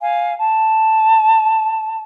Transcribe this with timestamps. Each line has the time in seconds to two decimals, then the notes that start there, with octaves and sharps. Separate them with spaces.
0.01 F5 G#5
0.37 A5